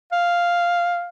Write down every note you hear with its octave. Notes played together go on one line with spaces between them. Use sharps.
F5